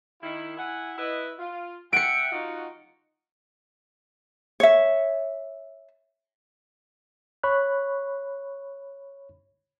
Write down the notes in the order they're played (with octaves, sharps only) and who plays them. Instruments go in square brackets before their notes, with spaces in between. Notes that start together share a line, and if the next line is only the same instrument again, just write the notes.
[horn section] D#3 E4
E4 F#5 G#5
E4 B4 D#5
F4
[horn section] E5 F#5 G5 [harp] C#7 D7
[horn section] D#4 F4 F#4
[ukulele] C#5 E5
[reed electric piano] C#5 B5 C#6 F#6